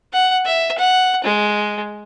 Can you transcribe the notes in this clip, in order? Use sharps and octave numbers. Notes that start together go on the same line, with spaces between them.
F#5
E5
F#5
G#3